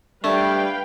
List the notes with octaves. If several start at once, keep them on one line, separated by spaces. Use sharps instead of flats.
G3 A3 D4 B4 D5 F5 G5